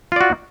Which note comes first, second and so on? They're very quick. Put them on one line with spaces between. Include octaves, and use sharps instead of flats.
F4 D5 F#4